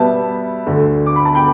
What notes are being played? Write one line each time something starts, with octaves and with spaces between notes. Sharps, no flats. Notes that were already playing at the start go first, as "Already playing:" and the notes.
Already playing: B2 G3 B3 E5 A5
D2 D3 A3
D6
B5
A5
G5 B5